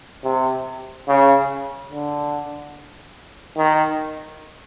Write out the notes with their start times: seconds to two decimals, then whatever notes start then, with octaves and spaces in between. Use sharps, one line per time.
0.24 C3
1.08 C#3
1.91 D3
3.58 D#3